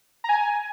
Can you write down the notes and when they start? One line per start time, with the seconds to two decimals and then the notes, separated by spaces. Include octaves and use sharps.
0.24 A#5
0.29 G#5